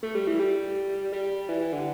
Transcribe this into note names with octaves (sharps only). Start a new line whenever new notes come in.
A3
G3
E3
G3
G3
E3
E3
D3